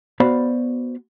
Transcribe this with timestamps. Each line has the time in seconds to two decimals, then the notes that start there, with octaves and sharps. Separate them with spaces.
0.20 B3 F#4 C5 D5 F5 B5